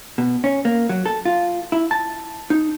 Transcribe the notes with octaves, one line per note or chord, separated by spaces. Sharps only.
B2
C#4
A#3
F#3
A4
F4
E4
A5
D#4